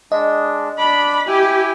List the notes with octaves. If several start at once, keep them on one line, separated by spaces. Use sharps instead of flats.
G#3 D4 D#5
D4 B5 D6
E4 G4 G5 G#5